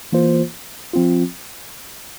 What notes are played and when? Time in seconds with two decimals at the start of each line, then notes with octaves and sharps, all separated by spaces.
0.13 E3 A#3 F4 C5
0.94 F3 C4 F4